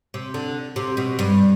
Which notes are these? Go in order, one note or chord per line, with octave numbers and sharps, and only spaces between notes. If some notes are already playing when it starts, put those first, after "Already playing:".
C3
D3
C3
B2
G2